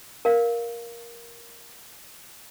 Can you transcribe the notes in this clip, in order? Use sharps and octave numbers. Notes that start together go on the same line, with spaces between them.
A#4 F5